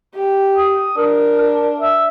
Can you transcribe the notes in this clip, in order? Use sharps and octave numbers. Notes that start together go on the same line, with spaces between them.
G4
D#6
D4 A#4
A#4
E5